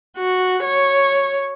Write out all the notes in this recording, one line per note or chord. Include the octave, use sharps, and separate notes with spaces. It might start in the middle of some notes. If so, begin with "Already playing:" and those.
F#4
C#5